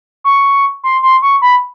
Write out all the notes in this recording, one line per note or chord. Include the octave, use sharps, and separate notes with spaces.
C#6
C6
C6
C#6
B5